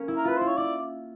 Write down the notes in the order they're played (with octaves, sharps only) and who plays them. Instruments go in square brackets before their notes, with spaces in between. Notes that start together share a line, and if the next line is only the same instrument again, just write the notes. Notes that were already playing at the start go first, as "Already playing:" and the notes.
Already playing: [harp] A#3 C#4
E4
[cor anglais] A#4
[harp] F4 [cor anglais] B4
[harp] E4 [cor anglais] C5
[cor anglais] C#5
[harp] E4 [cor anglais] D5